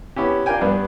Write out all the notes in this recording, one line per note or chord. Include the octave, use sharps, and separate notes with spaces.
B3 C#4 E4 G4
D4 F4 A#4 D5 G5 G#5
G2 B3 D4